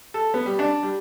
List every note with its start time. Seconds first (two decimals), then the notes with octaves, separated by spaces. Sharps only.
0.14 A4
0.34 B3
0.46 G3
0.59 D4
0.83 G3